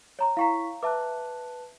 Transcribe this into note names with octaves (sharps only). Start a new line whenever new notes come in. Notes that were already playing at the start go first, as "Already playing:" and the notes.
C#5 A#5 C6
E4 F5 G5 A#5 C#6 B6
B4 E5 A5 D6 F#6